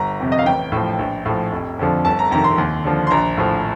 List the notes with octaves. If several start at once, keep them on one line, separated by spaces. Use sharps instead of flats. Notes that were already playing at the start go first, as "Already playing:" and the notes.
Already playing: G1 A#5
F2 C3
D#5
F5
A1 G5
A2 F3
A#1
A2 F3
F1
F2 D3 F3
G1 A5
A#5
F2 C3 D#3 A#5
C6
D#2
D3 F3
C6
A#1 A#5
A2 F3